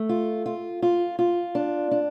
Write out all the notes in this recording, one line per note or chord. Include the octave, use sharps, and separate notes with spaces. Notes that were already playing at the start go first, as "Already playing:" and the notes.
Already playing: A3
F4
F4
F4
F4
D4
D4